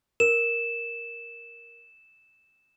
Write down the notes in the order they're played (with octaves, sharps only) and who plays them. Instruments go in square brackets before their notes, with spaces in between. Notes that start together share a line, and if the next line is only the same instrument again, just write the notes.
[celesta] A#4 [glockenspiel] E7